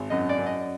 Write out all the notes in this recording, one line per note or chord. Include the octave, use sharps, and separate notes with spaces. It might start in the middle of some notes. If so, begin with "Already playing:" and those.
Already playing: G#1
F#2 D#5
D5
F#2
D#5